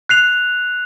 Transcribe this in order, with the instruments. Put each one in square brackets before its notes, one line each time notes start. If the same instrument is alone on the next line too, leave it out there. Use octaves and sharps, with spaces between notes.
[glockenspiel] F#6 C7 F7